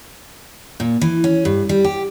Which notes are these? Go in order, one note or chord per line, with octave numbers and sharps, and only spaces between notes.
A#2
E3
C#4
G2
G3
G4